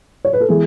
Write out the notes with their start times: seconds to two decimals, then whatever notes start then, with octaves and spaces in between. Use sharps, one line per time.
0.25 C#5
0.33 B4
0.40 A4
0.48 E3 G#3 B3 G#4